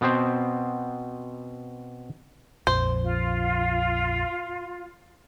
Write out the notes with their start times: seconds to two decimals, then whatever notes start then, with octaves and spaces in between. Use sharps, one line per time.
0.01 B2 B3 C4 C5
2.67 A#1 F2 C5
3.03 F4